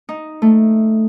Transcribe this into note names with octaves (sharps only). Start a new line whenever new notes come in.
D#4
A3